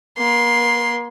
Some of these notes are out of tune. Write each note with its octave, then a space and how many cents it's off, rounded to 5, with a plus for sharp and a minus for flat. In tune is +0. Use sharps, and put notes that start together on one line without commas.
A#3 +40 C6 +0